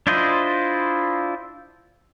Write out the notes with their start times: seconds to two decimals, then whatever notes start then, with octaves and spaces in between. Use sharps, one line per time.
0.07 D4 E4 F4 C5 D#5